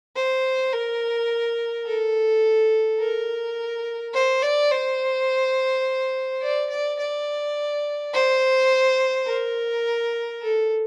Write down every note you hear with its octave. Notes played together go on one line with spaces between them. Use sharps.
C5
A#4
A4
A#4
C5
D5
C5
D5
D5
D5
C5
A#4
A4